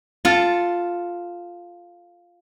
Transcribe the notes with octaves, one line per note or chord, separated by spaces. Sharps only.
F4 A4